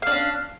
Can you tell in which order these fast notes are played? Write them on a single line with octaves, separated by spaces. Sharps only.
F5 D4 C#4